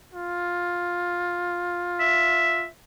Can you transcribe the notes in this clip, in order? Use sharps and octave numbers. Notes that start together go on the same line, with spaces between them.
F4
E5